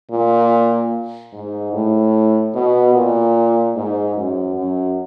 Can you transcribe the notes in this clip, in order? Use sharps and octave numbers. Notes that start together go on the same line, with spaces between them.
A#2
G#2
A2
B2
A#2
G#2
F#2
F#2